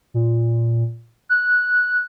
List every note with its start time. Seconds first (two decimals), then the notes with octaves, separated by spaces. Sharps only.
0.14 A#2
1.29 F#6